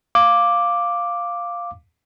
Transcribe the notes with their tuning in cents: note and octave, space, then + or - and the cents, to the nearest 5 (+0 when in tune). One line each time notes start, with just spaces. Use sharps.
F5 +0 D6 +0